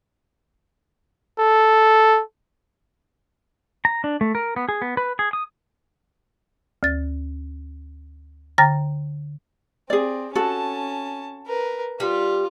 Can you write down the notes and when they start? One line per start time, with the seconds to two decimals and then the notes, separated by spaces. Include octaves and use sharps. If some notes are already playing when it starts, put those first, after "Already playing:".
1.39 A4
3.85 A#5
4.04 D4
4.21 A3
4.35 A#4
4.56 B3
4.69 G#4
4.82 B3
4.97 B4
5.19 G#4
5.33 D#6
6.83 D2 A6
8.58 D3 G5 A#5 F6 A6 A#6
9.90 C4 G#4 D5
10.35 C#4 F#4 A4 A5
11.47 A#4 B4
12.00 G3 F4